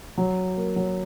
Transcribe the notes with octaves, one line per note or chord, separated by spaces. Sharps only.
F#3
A#3
F#3